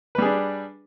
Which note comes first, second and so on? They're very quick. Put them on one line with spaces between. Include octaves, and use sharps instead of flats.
B4 G3 G#4 D4